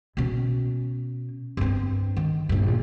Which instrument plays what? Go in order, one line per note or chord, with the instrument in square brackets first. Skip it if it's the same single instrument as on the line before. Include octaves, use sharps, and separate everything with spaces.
[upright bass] B2 C#4
G2 C4
D#3
A#1 G2